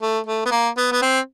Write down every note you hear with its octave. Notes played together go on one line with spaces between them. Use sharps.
A3
A3
B3
A#3
B3
B3
C4